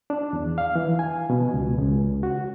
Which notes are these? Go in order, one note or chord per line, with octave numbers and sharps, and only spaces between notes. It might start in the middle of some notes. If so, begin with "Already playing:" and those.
D4
E2
F5
E3
G#5
B2
C#2
C#2
F#4